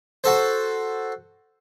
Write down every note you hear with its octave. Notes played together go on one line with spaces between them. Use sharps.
F#4 A4 C5